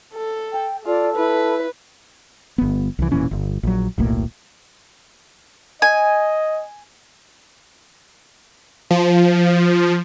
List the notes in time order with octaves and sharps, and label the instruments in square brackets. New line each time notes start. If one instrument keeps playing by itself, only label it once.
[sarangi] A4
[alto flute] G5
[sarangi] F4 [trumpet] A4 [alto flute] D5
[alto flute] E4 [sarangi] B4
[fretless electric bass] G1 B3
C2 E3
E1 A#2 E3 C#4
G1
A#1 F#3
D#1 B1 A2 A#3
[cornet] D#5 [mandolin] G#5
[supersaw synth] F3